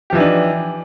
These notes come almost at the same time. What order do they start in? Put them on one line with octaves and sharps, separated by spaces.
G4 F3 E3 D#4 D4